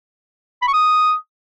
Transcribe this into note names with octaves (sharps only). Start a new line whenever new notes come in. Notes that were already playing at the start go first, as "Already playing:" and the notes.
B5
C#6
D#6